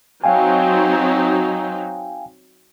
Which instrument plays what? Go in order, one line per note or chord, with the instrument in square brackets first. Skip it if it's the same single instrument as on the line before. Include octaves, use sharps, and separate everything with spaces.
[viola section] F#3 C4 D#4 [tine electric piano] F5 G5 G#5